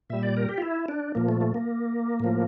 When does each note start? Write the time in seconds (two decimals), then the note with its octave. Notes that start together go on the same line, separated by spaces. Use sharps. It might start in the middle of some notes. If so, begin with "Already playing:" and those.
0.10 A#2 G3 E5
0.23 D5
0.37 A#4
0.49 G4
0.58 F4
0.62 E4
0.88 D4
1.15 A#2 F3 A#3
1.29 A3
1.41 A3
1.54 A#3
2.20 A2 F3